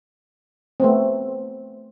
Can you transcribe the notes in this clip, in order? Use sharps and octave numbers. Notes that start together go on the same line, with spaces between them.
A3 B3 C4